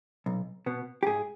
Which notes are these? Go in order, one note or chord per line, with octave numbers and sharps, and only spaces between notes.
B1
B2 B3
G4
G#2 G#4